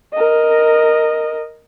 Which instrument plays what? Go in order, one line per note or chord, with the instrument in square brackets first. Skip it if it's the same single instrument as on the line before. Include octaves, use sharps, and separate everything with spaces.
[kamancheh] A#4 D#5